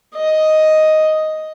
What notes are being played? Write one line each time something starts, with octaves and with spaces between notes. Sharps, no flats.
D#5